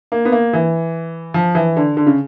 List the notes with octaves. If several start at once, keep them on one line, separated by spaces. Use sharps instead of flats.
A#3
B3
A#3
E3
F3
E3
D3
D3
C#3